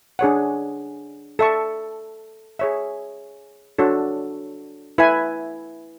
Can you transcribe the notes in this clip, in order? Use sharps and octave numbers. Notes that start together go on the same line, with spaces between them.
D4 G#4 C#5 F#5
A4 E5 A5 C#6
G#4 C#5 E5
D4 F#4 A4 C#5
E4 B4 E5 G#5